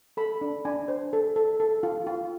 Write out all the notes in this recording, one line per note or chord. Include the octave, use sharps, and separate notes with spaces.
A4 B5
D4
D4 G#5
C5
A4
A4
A4
F4
F4